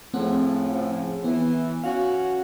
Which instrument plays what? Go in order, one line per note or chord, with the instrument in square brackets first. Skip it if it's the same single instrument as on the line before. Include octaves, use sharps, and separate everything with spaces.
[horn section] A2 C#3 F3 [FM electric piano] A3 C4 F#5
[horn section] E3 [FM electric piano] B3
[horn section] C#4 F#4 [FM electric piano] F5